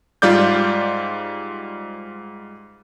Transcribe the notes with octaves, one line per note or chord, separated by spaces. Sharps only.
G#2 G3 F4 D5 D6 G6